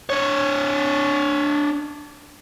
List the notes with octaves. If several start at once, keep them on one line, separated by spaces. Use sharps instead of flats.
D4 C#5